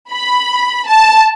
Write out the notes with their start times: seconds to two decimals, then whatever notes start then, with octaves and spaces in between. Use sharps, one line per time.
0.11 B5
0.88 A5